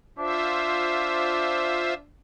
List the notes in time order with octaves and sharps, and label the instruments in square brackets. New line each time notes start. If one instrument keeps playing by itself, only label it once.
[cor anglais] D4 [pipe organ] F4 C5 E5